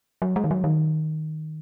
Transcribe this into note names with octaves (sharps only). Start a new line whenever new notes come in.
F#3
G#3
D#3
F#3
D#3